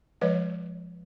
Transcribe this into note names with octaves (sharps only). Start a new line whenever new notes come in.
F3 G#3 B4 C#5 D#5